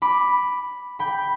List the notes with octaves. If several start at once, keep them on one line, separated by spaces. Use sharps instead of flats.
B5 D6
G5 B5